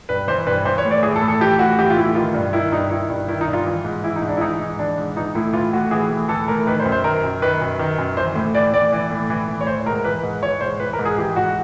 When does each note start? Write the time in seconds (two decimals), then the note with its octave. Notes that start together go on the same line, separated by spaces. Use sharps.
0.09 G2 B4
0.28 E3 C5
0.47 G2 B4
0.65 E3 C5
0.78 C#5
0.85 A2
0.91 D5
1.03 E3 G#4
1.16 A4
1.21 A2
1.28 A4
1.40 E3 G4
1.59 A2 F#4
1.79 E3 G4
1.90 F4
1.97 A2 E4
2.15 D#3 F4
2.34 G2
2.53 D#3 E4
2.72 G2 D#4
2.91 D#3 E4
3.10 G2
3.28 D#3 E4
3.41 D#4
3.48 G2
3.53 F4
3.66 E3
3.85 G#2
4.04 E3 E4
4.16 D#4
4.22 G#2
4.28 D4
4.37 E4
4.41 E3 D#4
4.60 G#2
4.79 E3 D4
4.98 G#2
5.17 E3 D#4
5.35 A2 E4
5.53 E3 F4
5.73 A2 F#4
5.91 E3 G#4
6.10 A2
6.29 E3 A4
6.48 A2 A#4
6.67 D#3 B4
6.80 C5
6.85 F#2
6.92 C5
7.04 D#3 A#4
7.23 F#2
7.42 D#3 B4
7.61 F#2
7.79 D#3
7.98 F#2
8.17 E3 C5
8.35 A2
8.55 E3 D5
8.73 A2 D5
8.92 E3
9.11 A2
9.30 E3
9.48 A2
9.61 C#5
9.67 E3 C5
9.86 G#2 A#4
10.05 E3 B4
10.23 G#2
10.42 E3 C#5
10.61 G#2 C5
10.80 E3 B4
10.93 A#4
10.99 G#2
11.05 G#4
11.18 E3 G4
11.36 G#2 F#4